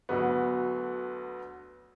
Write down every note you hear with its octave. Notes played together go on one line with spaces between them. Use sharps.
D2 D3 F#3 B3